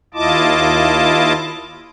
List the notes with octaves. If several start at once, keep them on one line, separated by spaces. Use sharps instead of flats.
D#2 E4 F4 D#5 A5 D6